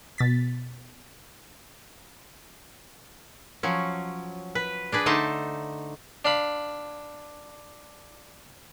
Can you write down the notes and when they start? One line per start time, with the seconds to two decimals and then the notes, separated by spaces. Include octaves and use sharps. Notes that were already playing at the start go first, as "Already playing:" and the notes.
0.18 B2 A6 B6
3.63 F3 F#3 C#4
4.55 B4
4.92 D4 G#4 B4
5.06 D3 A3 D#4 C5 A5
6.25 D4 F5 B5